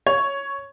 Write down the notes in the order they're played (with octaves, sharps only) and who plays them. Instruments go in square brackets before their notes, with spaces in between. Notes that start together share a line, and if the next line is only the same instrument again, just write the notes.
[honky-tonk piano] C#5